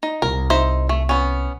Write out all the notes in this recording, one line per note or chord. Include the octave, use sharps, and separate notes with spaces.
D#4
C2 A#4
D#4 C5 E5
A3
B3 C#4